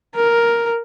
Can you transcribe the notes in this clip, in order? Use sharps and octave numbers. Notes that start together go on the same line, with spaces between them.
A#4